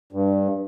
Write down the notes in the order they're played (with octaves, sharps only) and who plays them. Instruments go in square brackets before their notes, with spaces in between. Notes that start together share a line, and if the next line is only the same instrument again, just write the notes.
[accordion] G2